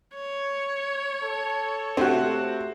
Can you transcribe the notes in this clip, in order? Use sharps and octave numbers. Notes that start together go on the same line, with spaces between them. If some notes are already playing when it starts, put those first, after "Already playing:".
C#5
A4
C3 A3 C4 F4 F#4